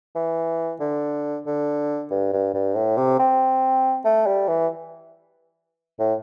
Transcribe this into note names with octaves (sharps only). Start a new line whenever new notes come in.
E3
D3
D3
G2
G2
G2
A2
C3
C4
A3
G3
E3
A2